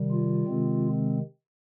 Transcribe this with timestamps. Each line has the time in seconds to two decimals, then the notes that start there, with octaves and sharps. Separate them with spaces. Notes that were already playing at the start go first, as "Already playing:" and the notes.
Already playing: C3 D#3 G3
0.11 F4
0.47 C3 D#3 G#3 C4